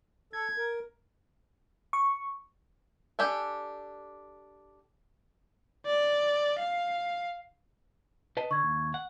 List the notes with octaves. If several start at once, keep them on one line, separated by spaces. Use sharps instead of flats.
A4 G#6
A#4
C#6
D4 G4 A4 G#5
D5
F5
B4 D#5 A5
D3 C#6 G#6
D#2
F#5